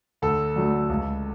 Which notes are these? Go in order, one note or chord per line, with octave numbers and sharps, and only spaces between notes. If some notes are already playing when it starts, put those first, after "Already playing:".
D2 A4
D3 F#3 A3
C#2